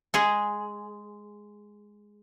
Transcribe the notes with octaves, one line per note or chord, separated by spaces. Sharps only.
G#3 G#4